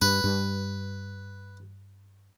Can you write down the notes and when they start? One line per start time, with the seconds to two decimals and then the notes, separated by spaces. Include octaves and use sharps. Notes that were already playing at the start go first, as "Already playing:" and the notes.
0.02 G2 B4
0.24 G2